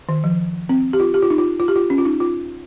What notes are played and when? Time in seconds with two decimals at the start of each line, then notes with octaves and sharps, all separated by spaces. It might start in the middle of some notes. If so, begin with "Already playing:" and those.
0.09 D#3
0.24 F3
0.69 C4
0.93 G4
1.00 F4
1.14 G4
1.23 F4
1.30 D#4
1.38 F4
1.60 F4
1.68 G4
1.76 F4
1.90 C#4
1.98 F4
2.05 D#4
2.20 F4